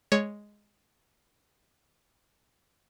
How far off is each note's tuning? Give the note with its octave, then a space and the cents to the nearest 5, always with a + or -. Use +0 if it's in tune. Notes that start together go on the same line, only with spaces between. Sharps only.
G#3 +0 C#5 +0